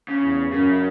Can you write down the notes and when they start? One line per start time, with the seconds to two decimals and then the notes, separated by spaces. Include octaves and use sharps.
0.08 C#3
0.23 E2
0.51 F#2 C#3